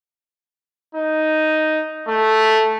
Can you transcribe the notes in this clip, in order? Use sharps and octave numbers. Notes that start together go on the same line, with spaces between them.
D#4
A3